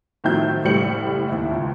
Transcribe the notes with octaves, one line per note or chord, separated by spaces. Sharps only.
A2 D#3 F3 F#3 E5 G6
F#1 A2 G3 C#7 F#7
D#2 E4
C#2